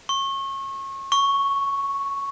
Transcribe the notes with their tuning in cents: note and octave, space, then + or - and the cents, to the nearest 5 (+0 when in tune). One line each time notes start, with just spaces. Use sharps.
C#6 -30
C#6 +0